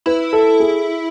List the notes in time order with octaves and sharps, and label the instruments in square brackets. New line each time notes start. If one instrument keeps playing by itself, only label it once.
[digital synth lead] E4 [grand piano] B4
[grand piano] A4
G#4